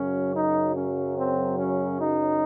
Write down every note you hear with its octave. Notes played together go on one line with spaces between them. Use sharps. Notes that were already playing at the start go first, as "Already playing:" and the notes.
Already playing: F#2 C#3 F#3 C#4
D#4
C#4
C4
C#4
D#4